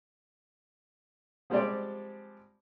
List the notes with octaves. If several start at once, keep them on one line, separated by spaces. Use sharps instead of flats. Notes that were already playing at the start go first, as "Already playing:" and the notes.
F3 G3 G#3 C4 G4 D5